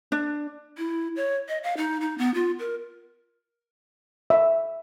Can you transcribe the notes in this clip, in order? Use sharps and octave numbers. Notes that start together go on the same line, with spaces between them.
D4
E4
C#5
D#5
F5
D#4
D#4
B3
F4
A#4
E5